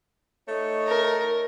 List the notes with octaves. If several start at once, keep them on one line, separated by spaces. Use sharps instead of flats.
A3 D#4 C#5
A#4